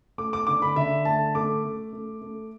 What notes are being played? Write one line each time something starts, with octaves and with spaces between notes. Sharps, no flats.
A3 D6
D6
D3 D6
B5
D3 E5
A3 A5
A3 D6
A3
A3
A3